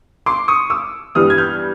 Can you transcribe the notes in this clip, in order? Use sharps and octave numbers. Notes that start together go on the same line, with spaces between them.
C6 D6
C#6 D#6
D6 E6
G2 E3 G3 B3 D#6 F6
G#6
F6 G6